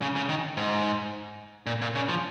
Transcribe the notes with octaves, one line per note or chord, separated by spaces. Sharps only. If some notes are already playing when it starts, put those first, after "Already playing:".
C#3
C#3
D#3
G#2
A#2
A#2
C#3
F3